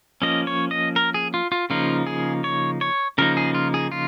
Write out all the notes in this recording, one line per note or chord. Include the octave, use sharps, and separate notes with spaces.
F3 A#3 C#4 D#5
C#5
D#5
A#4
G#4
F4
F4
C#3 F3 A#3 D#4 F4
G#4
C#5
C#5
C#3 F3 A#3 D#4 A#4
G#4
F4
G#4
F4